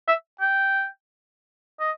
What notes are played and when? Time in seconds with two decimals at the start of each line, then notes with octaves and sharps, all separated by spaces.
0.08 E5
0.41 G5
1.80 D#5